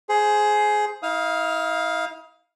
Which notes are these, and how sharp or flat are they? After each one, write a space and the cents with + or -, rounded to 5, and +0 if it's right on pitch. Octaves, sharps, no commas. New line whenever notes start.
G#4 +15 C5 +0
E4 -40 F5 +0 D#6 +25